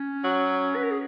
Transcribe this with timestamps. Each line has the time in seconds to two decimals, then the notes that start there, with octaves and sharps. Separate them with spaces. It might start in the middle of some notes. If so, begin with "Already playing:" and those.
Already playing: C#4
0.24 F#3
0.76 B4
0.83 A#4
0.91 G#4